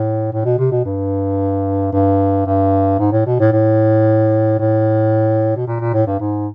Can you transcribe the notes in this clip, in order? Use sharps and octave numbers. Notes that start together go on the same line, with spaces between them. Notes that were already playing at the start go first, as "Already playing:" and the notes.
Already playing: A2
A2
B2
C3
B2
G2
G2
G2
G#2
A2
B2
A2
A2
A2
B2
A#2
A#2
A2
G2
G#2